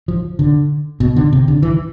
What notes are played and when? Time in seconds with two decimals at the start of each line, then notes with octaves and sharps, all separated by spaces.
0.08 F3
0.39 D3
1.00 B2
1.16 D3
1.33 C3
1.48 D3
1.62 E3